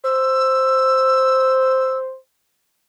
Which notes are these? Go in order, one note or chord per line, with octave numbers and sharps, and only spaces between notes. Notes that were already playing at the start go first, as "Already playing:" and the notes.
C5 E6